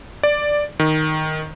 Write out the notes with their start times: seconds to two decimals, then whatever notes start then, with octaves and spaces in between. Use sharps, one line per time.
0.23 D5
0.80 D#3